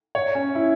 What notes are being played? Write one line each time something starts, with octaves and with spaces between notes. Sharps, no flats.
C#5
C#4
E4